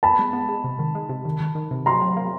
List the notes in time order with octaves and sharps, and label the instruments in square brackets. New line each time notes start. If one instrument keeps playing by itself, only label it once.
[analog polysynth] B3 [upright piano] A5 B5
[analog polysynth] G#3
B3
G#3
C3
D#3
G#3
C3
D#3
D#3
D#3
C3
[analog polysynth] F#3 [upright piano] A#5 C6
[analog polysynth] F#3
A#3